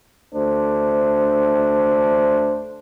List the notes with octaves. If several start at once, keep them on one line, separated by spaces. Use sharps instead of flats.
D2 A3 D4 C5